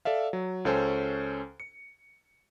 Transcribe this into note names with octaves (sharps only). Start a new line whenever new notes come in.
A4 D5 E5 F5
F#3
C#2 C#4 A4 C5 G#5
C#7